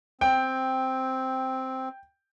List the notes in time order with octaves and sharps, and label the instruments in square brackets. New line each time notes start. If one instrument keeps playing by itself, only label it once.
[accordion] C4 [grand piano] G5